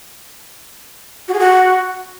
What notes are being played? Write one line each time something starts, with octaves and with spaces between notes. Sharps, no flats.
F#4
G#4
F#4